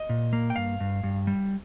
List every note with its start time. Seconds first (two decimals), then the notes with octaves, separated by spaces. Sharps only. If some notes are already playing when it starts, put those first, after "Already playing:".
Already playing: D#5
0.09 A#2
0.33 A#3
0.50 G5
0.56 G2 F5
0.80 G2
1.03 G2
1.27 G3